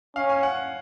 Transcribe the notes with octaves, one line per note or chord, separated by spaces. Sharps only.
C#4 F5
G#5
F#5